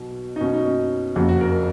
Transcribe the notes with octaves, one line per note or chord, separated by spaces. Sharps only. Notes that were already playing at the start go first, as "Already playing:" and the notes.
Already playing: B1 B2 F#3
D#4
B1 B2 F#3 C#4
D#4
C#4
F#1 F2 C#3 F#4
F#4
A#4